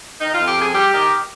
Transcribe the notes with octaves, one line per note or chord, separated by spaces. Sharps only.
D#3 D#4
F4
F2
G4
F2 G#4
G3 G4
D#3